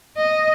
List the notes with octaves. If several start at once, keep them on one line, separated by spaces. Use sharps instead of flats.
D#5